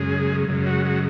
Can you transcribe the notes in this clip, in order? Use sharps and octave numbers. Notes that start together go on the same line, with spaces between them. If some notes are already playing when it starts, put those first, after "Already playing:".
Already playing: F#2 C#3 G#3 G#4
F#2 C#3 G#3
F#4
F#4